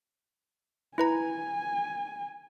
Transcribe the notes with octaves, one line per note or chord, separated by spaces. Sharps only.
E4 B4 G#5 A#5